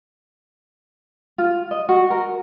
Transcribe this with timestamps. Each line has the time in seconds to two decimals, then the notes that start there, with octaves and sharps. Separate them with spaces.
1.38 F4
1.71 D#5
1.89 F#4
2.10 A#4